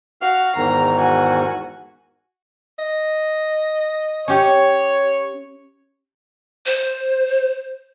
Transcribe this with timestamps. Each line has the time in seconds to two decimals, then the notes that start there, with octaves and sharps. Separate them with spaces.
0.21 F#4 F5 F6
0.56 E2 G#2 D#3 A#5
0.98 F#4 G#5
2.79 D#5
4.28 C#4 G4 C#5
6.66 C5